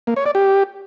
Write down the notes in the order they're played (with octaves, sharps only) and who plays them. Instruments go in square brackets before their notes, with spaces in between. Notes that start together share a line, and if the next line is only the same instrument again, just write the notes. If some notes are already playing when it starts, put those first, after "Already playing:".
[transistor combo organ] A#3
C#5
D5
G4